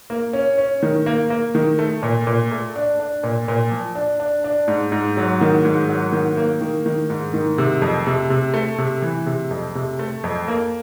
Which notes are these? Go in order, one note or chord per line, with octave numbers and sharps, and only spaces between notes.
A#3
C#4
C#4
D#3
A#3
A#3
D#3
A3
A#2
A#2
A3
D4
D4
A#2
A#2
F3
D4
D4
D4
G#2
G#2
F#3
D#3
G#2
F#3
D#3
A#3
D#3
D#3
G#2
D#3
C3
F2
C3
C3
A3
C3
E3
C3
F2
C3
A3
F2
A#3